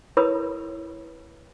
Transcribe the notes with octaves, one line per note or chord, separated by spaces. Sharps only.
E4 A#4 B4 C#5 B5 D#6